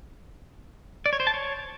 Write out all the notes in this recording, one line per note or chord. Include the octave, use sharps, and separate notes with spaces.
D5
C#5
C5
A5
C#5